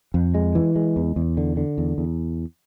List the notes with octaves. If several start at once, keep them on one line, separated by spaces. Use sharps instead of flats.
F2
G#3
E3
G#3
E2
E2
D3
D3
E2
E2